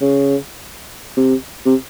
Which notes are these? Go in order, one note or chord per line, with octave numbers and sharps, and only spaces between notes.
C#3
C3
C3